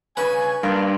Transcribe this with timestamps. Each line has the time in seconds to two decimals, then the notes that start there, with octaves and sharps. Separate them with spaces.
0.17 G2 C#3 C#4 B4 G#5
0.63 G2 A#3 D4 C6